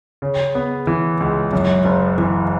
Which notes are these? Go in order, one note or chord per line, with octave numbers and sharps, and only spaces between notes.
C#3
B3
E3
C#2
F#2
F#1
E3